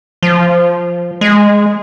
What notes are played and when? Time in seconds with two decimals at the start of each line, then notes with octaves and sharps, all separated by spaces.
0.23 F3
1.21 G#3